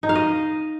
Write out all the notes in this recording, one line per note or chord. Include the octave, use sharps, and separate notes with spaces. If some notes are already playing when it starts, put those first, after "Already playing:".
D#4
F5
D#5